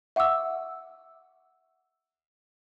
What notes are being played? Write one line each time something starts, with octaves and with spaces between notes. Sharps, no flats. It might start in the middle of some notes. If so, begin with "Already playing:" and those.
E5 F#5 C#6 D6 E6